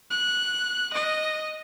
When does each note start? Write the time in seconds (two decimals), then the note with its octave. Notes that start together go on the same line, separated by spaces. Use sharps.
0.10 F#6
0.93 D#5